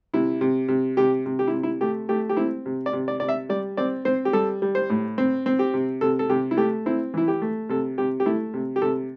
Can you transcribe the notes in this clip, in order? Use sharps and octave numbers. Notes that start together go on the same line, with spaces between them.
C3 E4
C3
C3
C3 G4
C3
G4
E4
C3
E4
A3 G4
A3 G4
G4
C4 E4
C3
D5
C3
D5
C3 D5
E5
G3 D5
C4 D5
C4 C5
G4
G3 A4
G3
C5
A2
C4
C4
G4
C3
C3 A4
A4
C3 G4
E4
A3 G4
C4 E4
E3 E4
G4
A3
C3 A4
C3 G4
G4
A3 E4
C3
G4
C3 A4